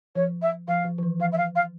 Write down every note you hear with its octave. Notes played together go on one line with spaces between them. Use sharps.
F3 C#5
E5
F3 F5
F3
F3
E3
F3 F5
E5
F5
F5